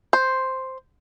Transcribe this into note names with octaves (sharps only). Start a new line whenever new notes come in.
C5